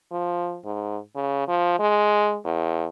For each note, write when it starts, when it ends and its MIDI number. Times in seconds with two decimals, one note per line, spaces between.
0.11 0.58 53
0.65 0.98 44
1.15 1.44 49
1.48 1.78 53
1.79 2.37 56
2.45 2.87 40